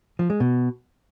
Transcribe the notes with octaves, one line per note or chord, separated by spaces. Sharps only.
F3
G#3
B2